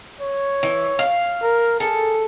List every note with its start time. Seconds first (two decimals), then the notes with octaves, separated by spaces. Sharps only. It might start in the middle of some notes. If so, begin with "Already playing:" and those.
0.21 C#5
0.63 E3
0.99 F5
1.43 A#4
1.80 G#4 A4